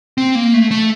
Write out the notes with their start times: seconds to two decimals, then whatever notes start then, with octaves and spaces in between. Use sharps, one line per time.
0.18 C4
0.35 A#3
0.54 A3
0.71 A3